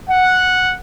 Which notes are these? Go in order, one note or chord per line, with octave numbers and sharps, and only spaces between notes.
F#5